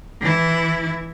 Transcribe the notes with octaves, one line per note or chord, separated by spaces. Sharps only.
E3 E4